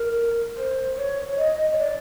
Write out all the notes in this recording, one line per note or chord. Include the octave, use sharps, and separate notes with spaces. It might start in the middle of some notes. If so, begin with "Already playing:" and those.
Already playing: A#4
C5
C#5
D#5
C#5
D5